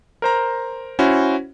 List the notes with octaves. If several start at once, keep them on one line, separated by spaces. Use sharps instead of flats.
A#4 C5 A#5
C#4 E4 F#4 C5